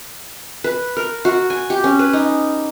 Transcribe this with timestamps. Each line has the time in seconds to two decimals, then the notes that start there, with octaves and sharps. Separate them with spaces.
0.64 B4
0.97 A#4
1.25 F#4
1.50 G#5
1.70 G4
1.84 C#4
1.99 B4
2.13 D#4